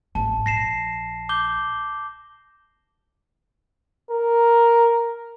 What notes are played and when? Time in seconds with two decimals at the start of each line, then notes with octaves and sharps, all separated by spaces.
0.15 G#1 A5
0.46 A#1 A#6 C7 E7
1.29 D6 G6 G7
4.10 A#4